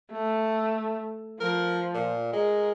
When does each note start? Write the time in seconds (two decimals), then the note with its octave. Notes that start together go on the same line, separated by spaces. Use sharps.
0.12 A3
1.40 F3 A#4
1.94 A#2
2.33 G#3 A#4